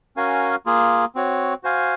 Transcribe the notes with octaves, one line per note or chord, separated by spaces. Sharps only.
C#4 F#4 A#4 F5 G#5
A#3 F4 G#4
C4 F#4 C#5
F#4 C5 F5 G#5